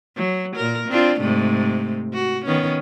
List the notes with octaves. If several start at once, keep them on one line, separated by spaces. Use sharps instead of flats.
F#3
A#2 A#4
C4 D4 F4
G#2 C3 A3
F#4
D#3 B3 C#4